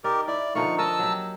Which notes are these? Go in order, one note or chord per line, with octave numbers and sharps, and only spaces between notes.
D#4 G4 A#4 D5
E4 D5
D3 F3 A#3 D#4 C#6
A#4 D#5 A5 E6
F#3 G4